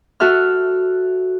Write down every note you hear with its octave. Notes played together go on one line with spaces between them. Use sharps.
F#4 A4 E5 F6